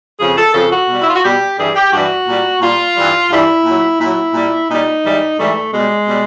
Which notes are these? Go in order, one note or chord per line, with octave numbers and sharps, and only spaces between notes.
F2 C#3 F3 G#4
A4
F2 C#3 F3 A4
F#4
B2 G3
E4
F4
F#4
B2 G3 G4
G2 E3 G3 G#4
G4
G2 E3 G3 F#4
A#2 G3
A#2 G3 F4
G2 E3 G3
G2 E3 G3 E4
A#2 F#3
A#2 F#3 E4
A#2 G3
A#2 G3 D#4
G#2 E3 G3
G#2 E3 G3 A3
B2 G3 G#3
B2 G3